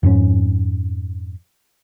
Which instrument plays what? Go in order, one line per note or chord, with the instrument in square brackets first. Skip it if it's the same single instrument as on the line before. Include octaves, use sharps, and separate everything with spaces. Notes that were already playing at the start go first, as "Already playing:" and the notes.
[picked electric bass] F2 G#2 C#4